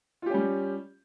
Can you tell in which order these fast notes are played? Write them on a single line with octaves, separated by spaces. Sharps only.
F4 G4 C#4 G3